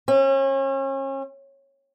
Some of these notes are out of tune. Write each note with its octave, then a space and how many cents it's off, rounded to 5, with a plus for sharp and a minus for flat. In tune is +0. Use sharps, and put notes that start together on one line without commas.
C#4 -35